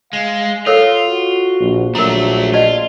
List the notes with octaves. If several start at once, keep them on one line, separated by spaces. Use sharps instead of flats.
G#3 F5
F4 A4 A#4 C#5 F5
F#4
A#1
A#1 F#3 A3 D4 A#4 A#5
F4 D5 D#5 A5